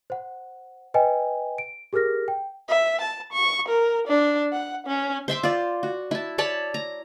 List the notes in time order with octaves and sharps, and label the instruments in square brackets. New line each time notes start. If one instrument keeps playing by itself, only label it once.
[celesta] C5 F#5
B4 D#5 G5 G#5
D7
G4 G#4 A#4 F6 A#6
G5
[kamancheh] E5
A5
C#6
A#4
D4
F#5
C#4
[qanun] C5 E5 C6 D6
F4 D5
F#4
E4 A5
C#5 D5 A5 B5
A#5